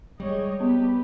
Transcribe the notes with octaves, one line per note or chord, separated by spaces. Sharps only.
G3 G#3 C#5 D#5
B3 G4 B4